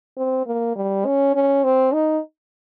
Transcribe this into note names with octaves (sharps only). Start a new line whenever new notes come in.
C4
A#3
G3
C#4
C#4
C4
D#4